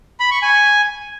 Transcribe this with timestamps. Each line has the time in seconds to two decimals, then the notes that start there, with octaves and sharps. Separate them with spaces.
0.20 B5
0.31 C#6
0.42 G#5